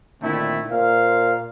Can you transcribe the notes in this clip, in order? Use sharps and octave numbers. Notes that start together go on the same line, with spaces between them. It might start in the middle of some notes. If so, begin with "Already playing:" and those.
A#2 D3 D#3 A3 C4 E4
A#2 A#4 C5 F5